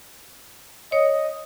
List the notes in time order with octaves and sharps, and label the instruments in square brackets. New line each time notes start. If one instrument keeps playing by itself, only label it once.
[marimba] C#5 [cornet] D#5